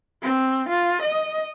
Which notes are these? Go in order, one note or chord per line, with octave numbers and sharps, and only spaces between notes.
C4
F4
D#5